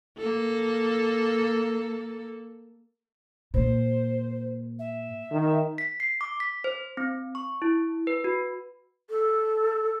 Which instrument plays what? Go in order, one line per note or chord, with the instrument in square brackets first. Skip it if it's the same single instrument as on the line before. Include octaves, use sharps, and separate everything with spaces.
[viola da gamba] A#3 A4
[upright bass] A#2 [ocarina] C5
[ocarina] E5
[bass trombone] D#3
[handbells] B6
C7
D6
B6
C5
C4
C#6
E4
B4
F#4
[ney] A4